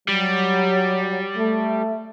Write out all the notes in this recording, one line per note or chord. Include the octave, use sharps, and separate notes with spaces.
F#3 G3
A3